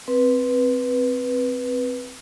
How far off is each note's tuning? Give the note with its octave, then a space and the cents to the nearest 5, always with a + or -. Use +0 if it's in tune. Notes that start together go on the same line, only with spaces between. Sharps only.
C4 +0 B4 -10